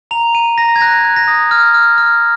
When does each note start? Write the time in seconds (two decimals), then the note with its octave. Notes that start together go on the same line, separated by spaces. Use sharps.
0.11 A#5 F7
0.34 A#5 D#7
0.58 A#5 A#6
0.76 G#6
0.81 F#6 A#6
1.05 F#6
1.16 A#6
1.28 D#6
1.51 F6
1.74 F6
1.98 F6